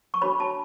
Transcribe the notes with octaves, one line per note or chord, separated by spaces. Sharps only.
C#6
D4 F#4 C#5 B5
A5